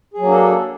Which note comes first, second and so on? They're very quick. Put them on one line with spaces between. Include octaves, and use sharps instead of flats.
G#4 F#3 A#3 D4 A4